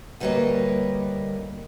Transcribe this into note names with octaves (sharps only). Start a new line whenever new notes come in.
D2 G3 A#3 B4 C#5 D#5